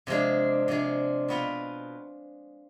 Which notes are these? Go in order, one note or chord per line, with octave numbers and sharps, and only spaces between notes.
C3 F3 G#3 D4
C3 F3 G#3 D4
B2 B3 F4